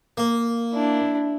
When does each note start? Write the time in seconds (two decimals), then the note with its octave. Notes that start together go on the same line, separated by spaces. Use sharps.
0.17 A#3
0.73 D4 E4